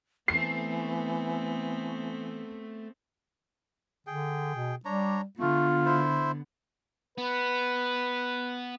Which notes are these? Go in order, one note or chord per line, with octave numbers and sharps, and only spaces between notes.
E3 A3 B3 C4 A5 C7
D3 G#4 G5
B2
G3 D4 C#5 A#5
D3 A3 B3 F4
E4 C5
B3 B4